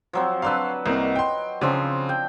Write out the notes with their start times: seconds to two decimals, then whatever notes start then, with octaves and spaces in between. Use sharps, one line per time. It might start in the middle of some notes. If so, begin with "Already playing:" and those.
0.13 F3 F#3 C4
0.42 F#3 D4 B4 F5 C6 E6
0.86 C2 A#3 C4 D#5
1.16 G5 C6
1.61 C#3 F3 C4 D4
2.09 G5